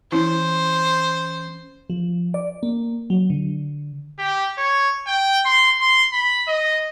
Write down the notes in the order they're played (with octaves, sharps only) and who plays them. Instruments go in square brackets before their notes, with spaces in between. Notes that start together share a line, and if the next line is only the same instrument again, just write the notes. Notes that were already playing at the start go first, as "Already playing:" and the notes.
[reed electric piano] E3 C#4 [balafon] E4 [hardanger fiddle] C5
[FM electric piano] F3
D5
A#3
F#3
D3
[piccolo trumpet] G4
C#5
G5
C6
C6
B5
D#5